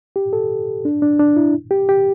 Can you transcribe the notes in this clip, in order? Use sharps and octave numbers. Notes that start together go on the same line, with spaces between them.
G4
A4
D4
D4
D4
E4
G4
G4